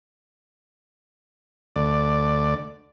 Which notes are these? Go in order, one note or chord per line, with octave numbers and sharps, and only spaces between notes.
D2 D5